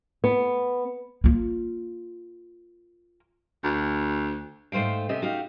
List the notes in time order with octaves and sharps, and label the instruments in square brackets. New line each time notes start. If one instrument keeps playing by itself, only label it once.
[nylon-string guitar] B3
[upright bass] A#3 F4
[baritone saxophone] D2
[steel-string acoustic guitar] G#2 A3 C5 F5 G5
C3 G4 D#5 E5 G#5
D#4 F#4 G4 F5